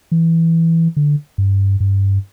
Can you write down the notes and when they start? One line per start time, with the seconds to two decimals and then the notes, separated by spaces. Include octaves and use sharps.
0.12 E3
0.97 D3
1.38 G2
1.80 G2